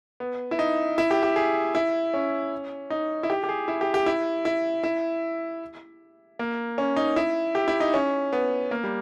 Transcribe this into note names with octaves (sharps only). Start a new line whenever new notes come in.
B3
E4
D#4
E4
G4
G4
G#4
E4
C#4
D#4
E4
G4
G4
G#4
E4
G4
G4
E4
E4
E4
A#3
C#4
D#4
E4
G4
E4
D#4
C#4
B3
A#3
G3